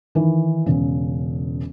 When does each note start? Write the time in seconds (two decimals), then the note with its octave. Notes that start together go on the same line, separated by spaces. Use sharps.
0.15 D#3 E3
0.66 E1 C#3